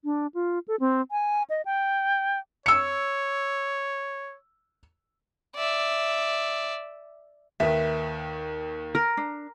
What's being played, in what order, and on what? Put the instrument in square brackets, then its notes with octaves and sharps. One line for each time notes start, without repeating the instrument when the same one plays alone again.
[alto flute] D4
F4
A4
C4
G#5
D#5
G5
[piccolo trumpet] C#5 [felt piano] E6 C#7
[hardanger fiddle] D5 E5
[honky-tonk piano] D#2 D#3 [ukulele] B4 E5
[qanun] A#4
[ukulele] D4